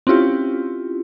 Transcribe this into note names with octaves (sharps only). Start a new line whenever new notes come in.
C4 C#4 E4 F4 G4